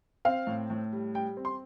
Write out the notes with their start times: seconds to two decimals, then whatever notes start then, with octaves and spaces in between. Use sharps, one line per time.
0.25 C4 F5
0.47 A2
0.70 A2
0.93 G3
1.14 G3 G5
1.37 C4
1.45 C6